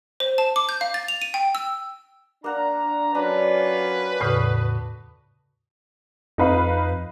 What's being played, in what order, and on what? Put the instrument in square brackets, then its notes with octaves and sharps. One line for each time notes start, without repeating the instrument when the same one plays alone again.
[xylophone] C5
A5
D6
G6
F5
A6
F7
D#7
G5
E6
[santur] A#3 F#5 [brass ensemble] D4 A#5
[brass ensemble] F#3 C#4 F4 [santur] D4 [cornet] B4
[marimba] E2 A2 C#3 [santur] B3 F#4
[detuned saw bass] F2 [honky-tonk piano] D#4 B4 F5